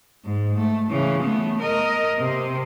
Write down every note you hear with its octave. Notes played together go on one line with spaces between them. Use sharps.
G#2
A3
C#3 E3
A3 B3
A#4 D#5
C3